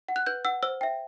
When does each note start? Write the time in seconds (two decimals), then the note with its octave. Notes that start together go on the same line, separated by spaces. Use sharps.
0.08 F#5
0.16 F#6
0.26 B4 G6
0.45 F#5 E6
0.63 C5 E6
0.81 E5 G5